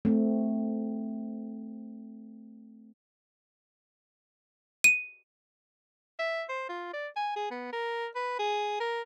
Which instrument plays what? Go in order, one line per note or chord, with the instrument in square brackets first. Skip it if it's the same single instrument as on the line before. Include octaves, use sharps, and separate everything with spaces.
[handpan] A3 C4
[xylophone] D#7
[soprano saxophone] E5
C5
F4
D5
G#5
G#4
B3
A#4
B4
G#4
A#4